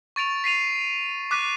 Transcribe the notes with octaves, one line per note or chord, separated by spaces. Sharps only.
C#6 A6 D7 F7
B6 C7 D#7 F7
D6 F#6 B6 D#7